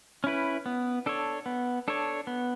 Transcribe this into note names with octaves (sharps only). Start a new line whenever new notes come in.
C#4 E4 B4
B3
D4 A4 C#5
B3
D4 A4 C#5
B3